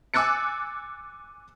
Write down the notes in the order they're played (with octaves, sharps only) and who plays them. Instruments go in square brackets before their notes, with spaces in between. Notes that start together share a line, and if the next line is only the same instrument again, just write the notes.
[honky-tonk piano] G#5 D6 E6 F#6 A6 C#7